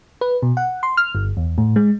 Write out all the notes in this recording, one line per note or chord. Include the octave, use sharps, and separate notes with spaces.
B4
B2
F#5
C6
F6
G1
E2
A2
G#3